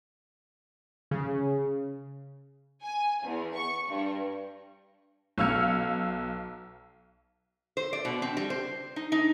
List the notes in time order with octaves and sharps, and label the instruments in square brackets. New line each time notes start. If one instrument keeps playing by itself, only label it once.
[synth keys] C#3
[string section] G#5
E2
C#6
G2
[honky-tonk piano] B1 F5 E6 F6 G#6 C#7
[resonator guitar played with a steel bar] C5
D5
B2
C4
G3
C5
D#4
D#4